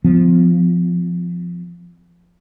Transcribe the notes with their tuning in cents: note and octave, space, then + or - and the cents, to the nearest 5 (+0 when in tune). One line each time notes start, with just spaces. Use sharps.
F3 +0 B3 +45